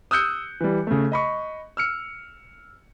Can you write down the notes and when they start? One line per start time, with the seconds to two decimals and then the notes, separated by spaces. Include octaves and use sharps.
0.11 D#6 E6 F#6 G6 C#7
0.61 E3 G3
0.87 C#3 A3
1.12 D#5 B5 C#6
1.77 E6 F6 C#7